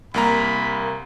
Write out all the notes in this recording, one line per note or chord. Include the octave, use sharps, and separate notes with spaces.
C2 A#3 A#5 B5